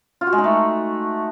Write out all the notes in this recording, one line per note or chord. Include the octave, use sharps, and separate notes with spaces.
F4
F#4
G#3
D#4
A3